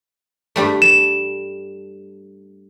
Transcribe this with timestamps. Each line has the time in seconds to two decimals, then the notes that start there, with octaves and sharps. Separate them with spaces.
0.56 G2 G3 A3
0.82 E7